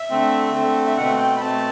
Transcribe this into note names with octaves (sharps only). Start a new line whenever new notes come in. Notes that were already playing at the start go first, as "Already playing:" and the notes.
Already playing: E5
D3 A3 C4
D3 A3 C4
E5
B2 A3 C4 F#5
G5
B5
B2 A3 C4 A5